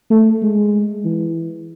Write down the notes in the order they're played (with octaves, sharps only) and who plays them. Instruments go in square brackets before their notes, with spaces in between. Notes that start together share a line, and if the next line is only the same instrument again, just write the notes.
[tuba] A3
G#3
E3